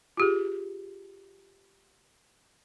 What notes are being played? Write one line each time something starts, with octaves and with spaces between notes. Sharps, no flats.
F4 G4 G#4